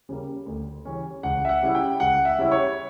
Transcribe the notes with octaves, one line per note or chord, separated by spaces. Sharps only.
C#3 G3 A#3
D2
C#3 E3 G3 C#4
C#2 F#5
E5
F#5
C#3 G3 C#4 E4
G5
C#2 F#5
E5
C#3 G3 C#4 E4
C#5